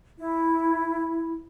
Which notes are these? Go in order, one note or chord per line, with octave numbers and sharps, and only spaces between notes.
E4